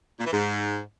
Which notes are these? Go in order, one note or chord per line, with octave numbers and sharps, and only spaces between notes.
A#2
E3
G#2